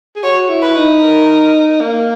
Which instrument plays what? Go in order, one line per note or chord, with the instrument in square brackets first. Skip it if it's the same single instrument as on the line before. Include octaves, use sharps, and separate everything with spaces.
[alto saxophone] G#4
[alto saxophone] F#4 [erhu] C#5
[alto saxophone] E4
[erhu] B4
[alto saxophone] D#4
[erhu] A#4
[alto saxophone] A#3